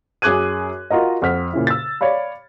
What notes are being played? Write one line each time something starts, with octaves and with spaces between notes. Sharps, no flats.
F#2 G#4 D6 F#6 G#6 D#7
F4 F#4 A#4 D#5
F2 F#5 F6 B6
A#2 C#3 E4
E6 A6
C#5 D5 F5 B5